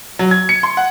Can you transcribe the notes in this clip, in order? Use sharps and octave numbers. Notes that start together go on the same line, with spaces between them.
F#3
G#6
C#7
C6
F#5